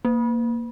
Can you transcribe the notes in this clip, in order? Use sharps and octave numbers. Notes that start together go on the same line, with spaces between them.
A#3